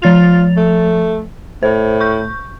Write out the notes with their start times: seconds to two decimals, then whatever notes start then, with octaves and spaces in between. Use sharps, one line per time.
0.02 F3 F4 A6 F7
0.56 A3
1.63 A2 C5
2.01 C#6 G6